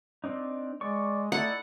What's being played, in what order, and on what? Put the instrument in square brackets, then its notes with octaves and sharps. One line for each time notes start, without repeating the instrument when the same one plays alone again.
[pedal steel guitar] C4 D4 D#4
[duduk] G#3 [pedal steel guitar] D5 C#6
[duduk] A3 [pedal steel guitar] D#4 E4 D5 [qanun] F#5